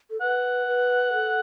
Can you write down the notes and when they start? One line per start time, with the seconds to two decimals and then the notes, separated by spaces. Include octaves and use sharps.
0.10 A4
0.21 B4 F#5
0.67 B4
1.13 A4